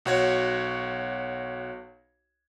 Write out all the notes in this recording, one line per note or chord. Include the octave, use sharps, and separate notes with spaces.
B1 F#4 C#5